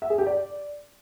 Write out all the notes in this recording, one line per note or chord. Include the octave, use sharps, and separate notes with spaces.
E5
G#4
G4
D5